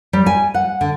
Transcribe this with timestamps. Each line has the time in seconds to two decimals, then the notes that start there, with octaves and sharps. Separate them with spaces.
0.13 G3
0.26 G#5
0.54 F#5
0.81 D3